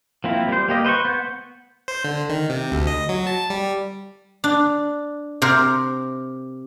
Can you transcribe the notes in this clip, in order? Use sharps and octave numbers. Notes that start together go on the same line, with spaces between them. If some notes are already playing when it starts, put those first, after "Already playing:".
F3 A#3 C4 E4
G3 C5
A#3 G4 D#5
B4 C5 D#5 C#6
B3 F#5 G6
C5
D3
D#3
C3
D2
D#5
F#3
A5
G3
D4
C3 A#4 C5